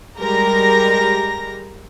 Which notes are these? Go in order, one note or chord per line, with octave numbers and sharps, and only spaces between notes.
G3 G#3 G4 A#4 A#5 A#6